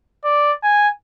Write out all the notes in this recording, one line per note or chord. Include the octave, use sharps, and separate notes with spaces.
D5
G#5